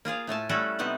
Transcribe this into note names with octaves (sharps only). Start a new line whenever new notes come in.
A#3 F4 G#4 F5
A2 A3 G#5 A5
G3 A3 C#4 E4 F#4 A4
C3 B3 C4 D#4 F#5